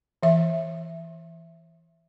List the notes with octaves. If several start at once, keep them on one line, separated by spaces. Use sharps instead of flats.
E3 E5